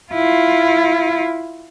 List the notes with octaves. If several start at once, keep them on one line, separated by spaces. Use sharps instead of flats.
E4 F4